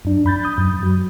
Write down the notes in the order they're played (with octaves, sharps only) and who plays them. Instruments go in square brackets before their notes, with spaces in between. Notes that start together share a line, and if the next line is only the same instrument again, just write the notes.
[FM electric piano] F#2 D4
F2 B5 G6 A6
D#6 G6
F#2
F#3